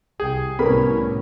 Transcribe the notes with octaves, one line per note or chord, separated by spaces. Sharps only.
C2 G4 G#4 G5
C2 A2 B3 C#4 G4 A#4 B4 B5